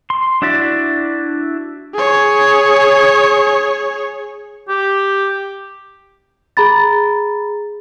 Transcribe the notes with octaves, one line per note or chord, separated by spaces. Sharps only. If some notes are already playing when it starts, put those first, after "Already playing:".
C6
D4 E4 F#4 D5 E5
G#4 C#5
G4
G#4 A#5 B5 A6